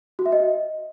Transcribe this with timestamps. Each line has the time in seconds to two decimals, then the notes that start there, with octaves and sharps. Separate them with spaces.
0.19 F#4
0.26 E5
0.32 D#5